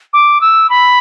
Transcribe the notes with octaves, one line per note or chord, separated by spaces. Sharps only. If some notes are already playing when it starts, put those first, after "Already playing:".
D6
E6
B5